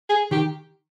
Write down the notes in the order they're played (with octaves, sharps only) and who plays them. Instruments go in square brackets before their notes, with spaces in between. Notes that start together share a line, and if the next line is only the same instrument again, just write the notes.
[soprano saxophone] G#4
[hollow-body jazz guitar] D#3 [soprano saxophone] G4